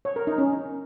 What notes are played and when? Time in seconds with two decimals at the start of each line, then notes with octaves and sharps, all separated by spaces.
0.05 C#5
0.16 A#4
0.27 D#4
0.38 C#4